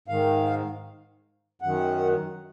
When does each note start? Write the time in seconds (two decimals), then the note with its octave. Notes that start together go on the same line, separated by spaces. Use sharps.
0.08 G#2 D#3 F5
1.62 F#2 D#3 F#5